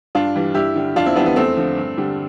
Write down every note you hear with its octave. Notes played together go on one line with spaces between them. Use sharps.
G2 D4 F4
E3 G3
G2 E4 G4
D3 G3
F2 D4 F4
C4 E4
E3 G3 B3 D4
B3
E2 A3 C4
D3 F3
G2
D3 G3